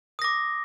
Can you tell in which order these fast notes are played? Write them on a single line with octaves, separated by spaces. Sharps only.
D#6 A#6 D6